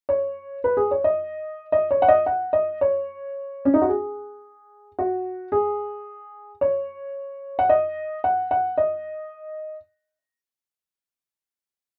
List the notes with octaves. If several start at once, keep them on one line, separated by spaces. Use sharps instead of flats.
C#5
B4
G#4
C#5
D#5
D#5
C#5
F#5
D#5
F#5
D#5
C#5
C#4
D#4
F#4
G#4
F#4
G#4
C#5
F#5
D#5
F#5
F#5
D#5